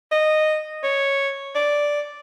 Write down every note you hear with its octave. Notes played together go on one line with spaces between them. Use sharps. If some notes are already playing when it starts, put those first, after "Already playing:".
D#5
C#5
D5